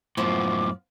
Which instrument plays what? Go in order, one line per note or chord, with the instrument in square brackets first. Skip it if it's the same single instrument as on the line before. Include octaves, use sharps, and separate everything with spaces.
[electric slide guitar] F#2 A2 [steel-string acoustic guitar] F3 A#3 B3 [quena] D6